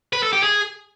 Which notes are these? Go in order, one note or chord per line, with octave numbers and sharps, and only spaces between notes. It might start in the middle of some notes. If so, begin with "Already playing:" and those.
B4
A4
G4
G#4